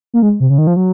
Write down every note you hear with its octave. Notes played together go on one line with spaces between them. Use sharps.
A#3
G#3
C3
C#3
D#3
F3
F#3